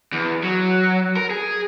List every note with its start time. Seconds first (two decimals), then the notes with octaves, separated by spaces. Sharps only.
0.12 E2
0.43 F#3
1.16 A#4
1.31 G#4